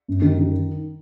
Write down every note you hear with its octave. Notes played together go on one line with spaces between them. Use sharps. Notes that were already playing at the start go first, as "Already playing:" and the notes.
F#2
D#3
D#3